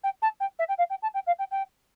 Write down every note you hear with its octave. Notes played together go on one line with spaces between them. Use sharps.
G5
A5
G5
E5
G5
F5
G5
A5
G5
F5
G5
G5